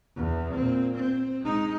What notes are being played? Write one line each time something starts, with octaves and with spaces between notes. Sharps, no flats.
E2
A#2 C4
C4
G#3 D#4